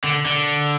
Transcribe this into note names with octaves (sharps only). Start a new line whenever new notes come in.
D3
D3